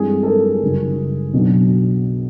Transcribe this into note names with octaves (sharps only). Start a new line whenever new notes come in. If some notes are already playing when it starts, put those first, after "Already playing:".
Already playing: G2 E3 G#3 C4 G#4
A4
G#4 A#4
F#1 F#2 D#3 G3
B1 B2 F#3 B3 D4